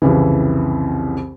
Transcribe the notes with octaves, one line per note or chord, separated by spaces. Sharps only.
C2 F2 C#3 E3